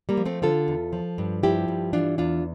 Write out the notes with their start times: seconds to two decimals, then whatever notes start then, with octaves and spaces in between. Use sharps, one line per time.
0.09 G3 A#3
0.17 F3
0.26 A3 C4
0.42 D3 F4 A4
0.68 E2
0.93 F3
1.18 G2
1.43 F3 E4 G4
1.68 G2
1.93 E3 D4 F4
2.18 E2 D4 F4